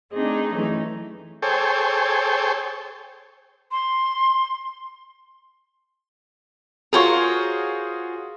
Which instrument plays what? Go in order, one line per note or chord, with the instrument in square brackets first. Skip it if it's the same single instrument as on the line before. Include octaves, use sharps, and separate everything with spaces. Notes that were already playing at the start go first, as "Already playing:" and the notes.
[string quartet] A3 C4 D4 D#4 G#4 D#5
E3 F#3 A3 C#4 D#4
[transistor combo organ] G#4 A4 C5 C#5 G5
[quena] C6
[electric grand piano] F4 F#4 G#4 [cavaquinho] A#4 C5 C#5